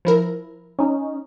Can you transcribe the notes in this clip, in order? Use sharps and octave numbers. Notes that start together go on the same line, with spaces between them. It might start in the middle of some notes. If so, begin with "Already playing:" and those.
F3 E4 A#4
C#4 D#4